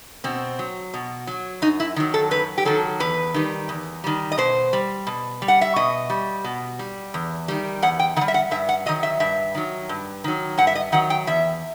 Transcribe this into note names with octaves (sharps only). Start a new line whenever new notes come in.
B2 C4
F#3
B2
F#3
F#2 D#4
E4
D#3 F#3
A4
F#2 B4
G4
D#3 F#3 A4
E2 B4
D#3 G3
E2
D#3 G3
D#5
B2 C5
G3
B2
G3
F#5
E5
B2 D#5
G3
B2
G3
E2
D#3 G3
E2 F#5
G5
D#3 F#5
G3
E5
F#5
G2 E5
F#5
D#3 F#3 D#5
E5
G2 E5
D#3 F#3
G2
D#3 F#3
G2 F#5
E5
D#5
D#3 F#3 F#5
G5
E2 E5